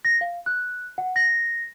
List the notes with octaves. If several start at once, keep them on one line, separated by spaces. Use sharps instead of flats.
A#6
F5
F#6
F#5
A#6